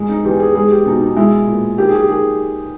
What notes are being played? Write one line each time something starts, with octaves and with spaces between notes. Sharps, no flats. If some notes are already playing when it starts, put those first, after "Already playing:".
Already playing: G#2 G#3
D#4
E2 G4
G#4
G#3 G#4
G4
B2 D#4
D#4
G#3 E4
A#2
D#3 G4
G#4
G4
D#3 G#4